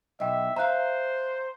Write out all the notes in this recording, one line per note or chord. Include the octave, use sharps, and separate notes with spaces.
B1 D#5 E5 G5
C5 E5 F5 A#5 F#6